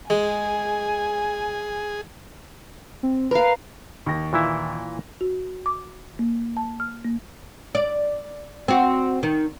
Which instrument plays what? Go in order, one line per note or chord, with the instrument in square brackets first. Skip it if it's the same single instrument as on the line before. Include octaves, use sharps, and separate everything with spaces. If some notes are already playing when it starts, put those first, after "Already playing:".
[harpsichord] G#3 [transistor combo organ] G#4 [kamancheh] G#5
[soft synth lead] C4
[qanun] A#4 F5 [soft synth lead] B4
[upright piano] D#2 C#6 A#6
[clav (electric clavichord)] A#2 E3 E4
[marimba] F#4
D6
A#3
A5
F6
A#3
[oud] D5
C4 F#4
D#3